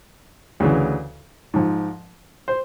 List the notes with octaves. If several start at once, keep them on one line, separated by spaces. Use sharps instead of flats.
D2 C#3 E3
G#2 F3
C5